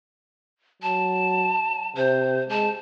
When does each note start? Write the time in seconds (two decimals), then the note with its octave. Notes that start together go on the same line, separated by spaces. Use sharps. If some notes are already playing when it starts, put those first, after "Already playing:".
0.82 F#3 A5
1.97 C3 C5
2.50 G#3 A5